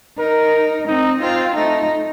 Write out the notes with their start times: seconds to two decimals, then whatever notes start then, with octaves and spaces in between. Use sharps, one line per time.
0.18 D#4 A#4
0.87 C4 D#4
1.22 C4 F4
1.56 A3 D#4